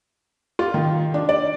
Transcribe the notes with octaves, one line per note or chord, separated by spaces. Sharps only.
F4
D#3
D4
D5